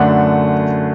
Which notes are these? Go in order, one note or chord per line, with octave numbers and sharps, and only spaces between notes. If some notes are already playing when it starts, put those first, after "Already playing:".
Already playing: F#2 D3 A3 D4 F#5